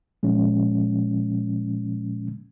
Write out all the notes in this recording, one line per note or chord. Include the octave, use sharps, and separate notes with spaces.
A#2 F3 G#3 C#4